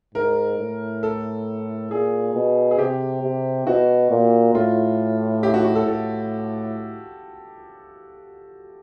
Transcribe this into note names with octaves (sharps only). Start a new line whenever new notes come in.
G#2 A#4
A2
A4
A#2 G#4
B2
G#4
C3 G4
C3
B2 F#4
A#2
A2 F4
G4
F#4
F#4
A4
A2 A4